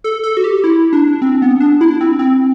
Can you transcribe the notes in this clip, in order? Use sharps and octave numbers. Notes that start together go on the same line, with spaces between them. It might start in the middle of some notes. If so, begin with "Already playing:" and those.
A4
A4
F#4
G4
E4
D4
C4
B3
D4
E4
C4
C4